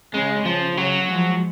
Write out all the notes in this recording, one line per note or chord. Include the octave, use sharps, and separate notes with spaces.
C#3 G#3
C#3 F3
C#3 F#3
F3 G#3